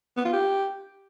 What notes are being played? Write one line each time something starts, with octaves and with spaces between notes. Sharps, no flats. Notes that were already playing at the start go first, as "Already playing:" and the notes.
B3
F4
G4